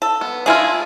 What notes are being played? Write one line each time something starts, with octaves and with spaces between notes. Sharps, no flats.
A4
B3
G#3 D4 E4 F4 G#4